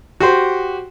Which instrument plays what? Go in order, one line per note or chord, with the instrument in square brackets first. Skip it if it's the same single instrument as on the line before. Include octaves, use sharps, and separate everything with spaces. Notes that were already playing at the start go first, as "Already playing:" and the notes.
[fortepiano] F#4 G4 C5